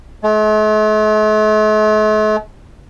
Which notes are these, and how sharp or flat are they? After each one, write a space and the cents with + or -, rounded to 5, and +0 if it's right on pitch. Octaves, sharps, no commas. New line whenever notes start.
A3 -45